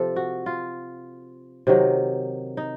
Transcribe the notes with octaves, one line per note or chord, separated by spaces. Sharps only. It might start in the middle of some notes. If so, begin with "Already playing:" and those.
Already playing: C3 F3 A4
F#4
F4
C3 D#3 F#3
D#4